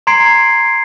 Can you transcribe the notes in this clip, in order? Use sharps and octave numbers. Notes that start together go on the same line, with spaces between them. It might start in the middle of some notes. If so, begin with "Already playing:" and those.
A#5 C6 G#6 C7 D7